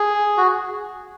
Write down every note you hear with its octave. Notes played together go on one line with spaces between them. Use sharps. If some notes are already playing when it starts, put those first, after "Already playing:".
Already playing: G#4
F#4